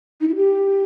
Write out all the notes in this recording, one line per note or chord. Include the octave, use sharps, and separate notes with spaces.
D#4
E4
G4